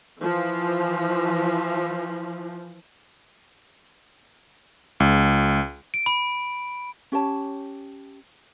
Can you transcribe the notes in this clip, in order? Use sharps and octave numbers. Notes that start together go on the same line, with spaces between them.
E3 F3
C#2
D7
B5
C#4 G4 C#5 A5